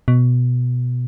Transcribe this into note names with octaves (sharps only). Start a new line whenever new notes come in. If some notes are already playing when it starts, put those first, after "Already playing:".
B2